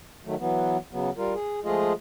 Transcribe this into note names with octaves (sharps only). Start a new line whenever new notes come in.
D#3 F#3 A3
E3 F#3 B3
C#3 F#3 B3
G3 F4 A#4
G#4
F3 G#3 A3 F4 G#4 D#5